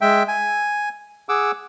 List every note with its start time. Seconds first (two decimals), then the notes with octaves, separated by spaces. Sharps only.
0.01 G#3 E5 G5
0.28 G#5
1.29 G#4 F#5 D6 E6